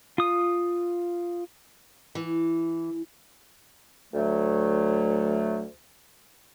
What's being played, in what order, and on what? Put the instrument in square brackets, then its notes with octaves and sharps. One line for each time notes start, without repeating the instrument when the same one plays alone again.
[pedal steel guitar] F4 D#6
[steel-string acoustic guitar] E3
[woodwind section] D2 F#3 A3